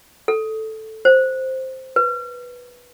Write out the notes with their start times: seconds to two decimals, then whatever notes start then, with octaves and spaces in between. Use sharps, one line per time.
0.28 A4
1.05 C5
1.96 B4